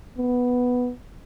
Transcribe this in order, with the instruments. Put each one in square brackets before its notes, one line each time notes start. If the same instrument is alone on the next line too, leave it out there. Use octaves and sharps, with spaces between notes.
[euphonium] B3